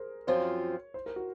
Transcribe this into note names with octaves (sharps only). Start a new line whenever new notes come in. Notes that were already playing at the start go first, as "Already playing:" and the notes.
Already playing: G#4 A#4 C5
F#2 F3 C4 F4 C#5
C5
A#4
F#4